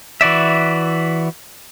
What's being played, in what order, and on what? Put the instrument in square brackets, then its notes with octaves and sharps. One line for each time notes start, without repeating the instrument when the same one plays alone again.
[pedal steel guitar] E3 F#4 D5 E5